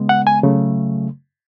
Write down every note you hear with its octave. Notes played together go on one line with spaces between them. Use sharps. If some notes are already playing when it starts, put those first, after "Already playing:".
Already playing: C#3 G#3 B3
F#5
G#5
C#3 F#3 A3